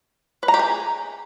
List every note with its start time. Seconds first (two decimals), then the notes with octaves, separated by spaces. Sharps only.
0.43 B4
0.48 A#5
0.54 G4
0.59 G#4